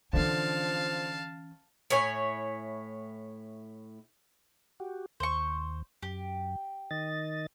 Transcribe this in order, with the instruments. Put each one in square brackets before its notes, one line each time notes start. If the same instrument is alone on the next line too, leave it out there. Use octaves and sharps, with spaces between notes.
[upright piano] D3 [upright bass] E3 C#4 [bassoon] F3 [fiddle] F5 A5
[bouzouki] A2 E4 C#5 G#5
[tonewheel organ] F#4 G4
[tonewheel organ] D#2 [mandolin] C5 C#6
[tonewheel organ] F#2 [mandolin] G4
[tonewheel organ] D#3 D#5 A6